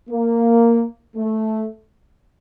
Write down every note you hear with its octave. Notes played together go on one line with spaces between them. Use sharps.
A#3
A3